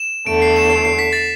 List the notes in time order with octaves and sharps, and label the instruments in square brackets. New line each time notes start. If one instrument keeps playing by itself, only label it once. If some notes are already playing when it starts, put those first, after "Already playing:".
Already playing: [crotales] E7
[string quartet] E2 D3 A3 [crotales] D7
[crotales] C7
E7
C7
C7
B6
A6